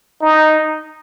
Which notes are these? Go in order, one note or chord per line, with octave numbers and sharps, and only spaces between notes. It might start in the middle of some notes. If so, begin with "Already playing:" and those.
D#4